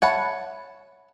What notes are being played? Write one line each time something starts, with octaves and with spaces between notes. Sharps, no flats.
C#5 E5 F#5 A5 B5